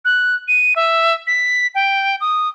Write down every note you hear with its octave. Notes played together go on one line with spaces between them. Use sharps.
F#6
D#7
E5
B6
G5
D#6